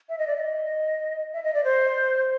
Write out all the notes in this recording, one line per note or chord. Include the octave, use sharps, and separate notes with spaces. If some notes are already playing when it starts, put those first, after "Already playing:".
E5
D#5
D5
E5
D#5
E5
D#5
D5
C5